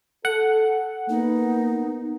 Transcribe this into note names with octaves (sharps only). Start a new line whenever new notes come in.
A4 F#5
A#3 B3 D#4